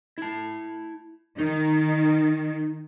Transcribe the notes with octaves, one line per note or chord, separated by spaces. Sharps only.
E4 A5
D#3 D#4